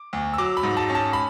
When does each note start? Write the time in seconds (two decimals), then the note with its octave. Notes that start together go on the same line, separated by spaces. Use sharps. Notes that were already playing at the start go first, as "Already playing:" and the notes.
Already playing: D6
0.13 D2
0.34 E6
0.38 F#3 D6
0.57 B5
0.63 G#2
0.77 A5
0.89 C#4
0.95 A5
1.13 B5